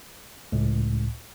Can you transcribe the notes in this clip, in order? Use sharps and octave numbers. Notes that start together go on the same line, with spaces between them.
C#2 A2